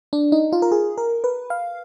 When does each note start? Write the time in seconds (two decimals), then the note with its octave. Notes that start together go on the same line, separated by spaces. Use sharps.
0.13 D4
0.32 D#4
0.52 F4
0.62 A#4
0.72 G#4
0.98 A#4
1.24 B4
1.50 F5